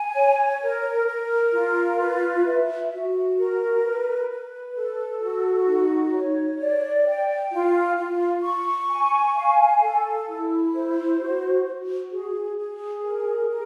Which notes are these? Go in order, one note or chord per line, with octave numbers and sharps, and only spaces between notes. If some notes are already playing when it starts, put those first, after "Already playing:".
Already playing: G#5
C#5
A#4
A#4
F4
B4
E5
F#4
A#4
B4
B4
A4
F#4
D#4
C#5
D5
G5
F4
F4
C#6
G#5
F5
A4
E4
C5
F#4
F#4
G#4
G#4
A#4
A#4